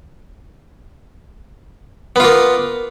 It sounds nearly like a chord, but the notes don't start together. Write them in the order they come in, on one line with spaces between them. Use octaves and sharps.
B3 F4 A#3